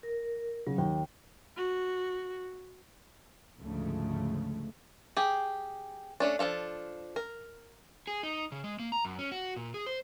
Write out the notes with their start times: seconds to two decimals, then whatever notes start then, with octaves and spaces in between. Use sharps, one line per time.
0.03 A#4
0.67 C#3 F#3
0.78 D#2 G5
1.57 F#4
3.60 D2 G#2 C#3 F3 A3
5.17 G4 G#4
6.20 A3 C#4 D4
6.39 F3 D4 A4 F5
7.16 A#4
8.07 G#4
8.23 D#4
8.52 C#3
8.64 G#3
8.79 A#3
8.92 A#5
9.05 F#2
9.19 C#4
9.32 F#4
9.56 A#2
9.74 G#4
9.87 C5